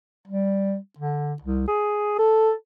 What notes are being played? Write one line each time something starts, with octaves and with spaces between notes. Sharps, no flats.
G3
D3
C2
G#4
A4